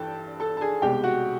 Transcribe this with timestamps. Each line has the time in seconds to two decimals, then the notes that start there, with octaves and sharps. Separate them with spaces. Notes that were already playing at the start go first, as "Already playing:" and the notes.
Already playing: G2 E3 A4 G5 A5
0.40 A4 A5
0.57 A5
0.61 G#4 G#5
0.82 C2 B2 G#3 G4 G5
1.04 F#4 F#5